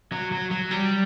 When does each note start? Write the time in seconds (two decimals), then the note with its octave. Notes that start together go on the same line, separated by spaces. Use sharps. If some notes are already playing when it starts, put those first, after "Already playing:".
0.12 F#3
0.32 F#3
0.51 F#3
0.71 G3